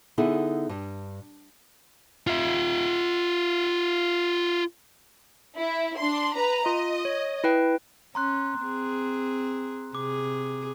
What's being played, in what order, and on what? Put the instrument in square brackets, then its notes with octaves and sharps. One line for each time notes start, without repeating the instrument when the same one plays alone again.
[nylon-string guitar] D3 B3 D#4 E4 G#4 A4
G2
[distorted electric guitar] F4 E5
[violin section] E4
D4 C6
B4 A#5
[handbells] F4 [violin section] D#5
[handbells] C#5
E4 B4 G5
[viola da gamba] C#4 [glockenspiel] A#5 C6 F#6
[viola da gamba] C4 G#4
[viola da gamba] C3 G#4 [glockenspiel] D6